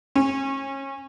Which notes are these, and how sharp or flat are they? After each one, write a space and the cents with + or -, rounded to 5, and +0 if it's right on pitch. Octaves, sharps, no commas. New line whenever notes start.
C#4 -25